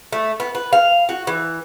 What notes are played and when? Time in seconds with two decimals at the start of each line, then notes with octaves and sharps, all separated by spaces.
0.12 A3
0.40 B3
0.55 B4
0.73 F5
1.09 F#4
1.27 E3